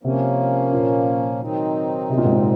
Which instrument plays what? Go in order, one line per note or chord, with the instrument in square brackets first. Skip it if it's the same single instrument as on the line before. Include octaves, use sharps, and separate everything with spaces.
[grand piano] C3 [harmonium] F3 A#3 C#4
[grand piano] A#2
[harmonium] D#3 F#3 C4 D#4
[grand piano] C3
A#2
G#2
A#2